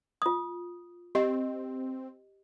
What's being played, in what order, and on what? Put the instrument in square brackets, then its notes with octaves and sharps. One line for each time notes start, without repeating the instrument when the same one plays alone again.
[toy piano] F4 D#6
[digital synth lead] C4 [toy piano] G4 D#5